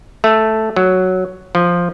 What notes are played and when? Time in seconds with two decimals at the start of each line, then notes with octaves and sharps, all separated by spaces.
0.24 A3
0.76 F#3
1.55 F3